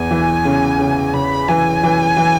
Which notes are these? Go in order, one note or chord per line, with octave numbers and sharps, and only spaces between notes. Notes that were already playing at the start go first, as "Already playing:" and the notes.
Already playing: E2 G#5
E3
C#3
C#3
C#3 B5
E3 G#5
E3
E3